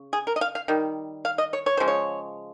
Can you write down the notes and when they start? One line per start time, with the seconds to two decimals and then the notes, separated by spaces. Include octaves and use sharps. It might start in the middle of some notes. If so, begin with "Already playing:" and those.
Already playing: C#3
0.13 G#4
0.27 A#4
0.36 D#5
0.41 F5
0.55 F5
0.68 D#3 G3
1.25 F5
1.38 D#5
1.53 C#5
1.66 C#5
1.77 C#3 F3 G#3 C5
1.88 C#5